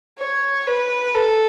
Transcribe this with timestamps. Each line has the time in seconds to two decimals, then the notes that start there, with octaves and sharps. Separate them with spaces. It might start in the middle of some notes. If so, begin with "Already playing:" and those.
0.19 C#5
0.67 B4
1.15 A4